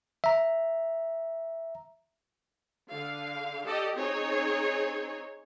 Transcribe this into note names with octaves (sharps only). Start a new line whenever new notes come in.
E5 A#5
D3 F5
G4 A4 D5 D#5
C4 D#4 G#4 C#5